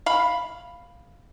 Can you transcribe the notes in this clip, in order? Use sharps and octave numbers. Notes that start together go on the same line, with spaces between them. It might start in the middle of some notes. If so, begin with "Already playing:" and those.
F5 B5